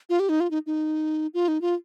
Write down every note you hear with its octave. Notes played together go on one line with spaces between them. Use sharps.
F4
G4
D#4
F4
D#4
D#4
F4
D#4
F4